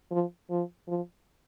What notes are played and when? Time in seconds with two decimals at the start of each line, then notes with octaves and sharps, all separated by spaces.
0.11 F3
0.50 F3
0.88 F3